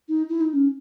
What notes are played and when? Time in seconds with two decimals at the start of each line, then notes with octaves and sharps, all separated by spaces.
0.09 D#4
0.29 E4
0.41 D#4
0.53 C#4